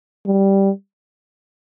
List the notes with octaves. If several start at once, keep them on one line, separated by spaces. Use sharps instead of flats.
G3